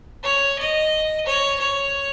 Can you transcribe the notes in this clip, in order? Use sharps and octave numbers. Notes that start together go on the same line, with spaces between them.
C#5
D#5
C#5
C#5